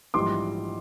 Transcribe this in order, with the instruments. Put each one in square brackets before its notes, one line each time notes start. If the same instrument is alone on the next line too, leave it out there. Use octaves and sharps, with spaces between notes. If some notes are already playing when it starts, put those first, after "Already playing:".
[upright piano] A#1 G#2 E3 G3 C6 D6